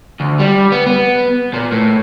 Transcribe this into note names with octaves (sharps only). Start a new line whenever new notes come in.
D2
G3
B3
B3
A#2
A2